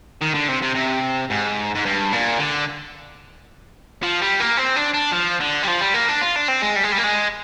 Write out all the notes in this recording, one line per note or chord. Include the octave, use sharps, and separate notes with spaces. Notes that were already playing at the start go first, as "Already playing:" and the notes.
D#3
D3
C3
C3
C3
G#2
G#2
G2
A#2
D3
F3
G3
A#3
C4
D4
D4
F3
D3
G3
F3
G3
A#3
D4
F4
D4
C4
G#3
G3
G#3
G3
A#3
G#3